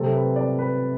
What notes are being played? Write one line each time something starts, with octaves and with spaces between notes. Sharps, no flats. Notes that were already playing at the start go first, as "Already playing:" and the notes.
Already playing: C3 F#3 A3 C4 A4
B4
D5
B4